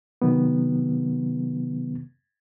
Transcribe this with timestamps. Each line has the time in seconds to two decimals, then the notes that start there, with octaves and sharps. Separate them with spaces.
0.22 C3 D#3 F#3 B3